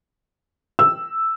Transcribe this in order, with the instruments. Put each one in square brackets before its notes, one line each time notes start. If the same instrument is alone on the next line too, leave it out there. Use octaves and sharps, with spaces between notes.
[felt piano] E6